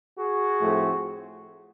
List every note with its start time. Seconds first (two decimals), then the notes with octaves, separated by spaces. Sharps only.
0.18 F#4 G#4
0.60 A2 F3 A3 C4